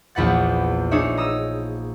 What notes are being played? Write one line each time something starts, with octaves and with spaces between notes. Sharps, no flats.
A#1 E2 B4 F#5 A6
D4 D#4 G#4 C#5 E5
A#5 D#6 E6